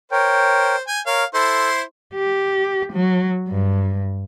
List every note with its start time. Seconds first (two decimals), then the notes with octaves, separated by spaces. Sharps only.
0.11 A#4 C5 C#5 G5
0.88 G#5 G6
1.06 A#4 C#5 F5
1.34 E4 A4 C5 C6
2.15 G4
2.93 F#3
3.49 G2